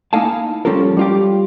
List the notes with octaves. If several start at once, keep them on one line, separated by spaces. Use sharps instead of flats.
A#3 D#4 E4 F5 G#5 A5
F3 G3 C#4 F4 A4 A#4
G3 F4 G4